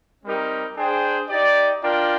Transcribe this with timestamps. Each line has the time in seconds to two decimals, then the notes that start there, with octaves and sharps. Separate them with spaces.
0.24 G3 C4 D#4 G4 A#4
0.76 D4 G#4 C5 G5
1.30 D#4 G4 D5
1.82 D4 F4 A#4 D5 G5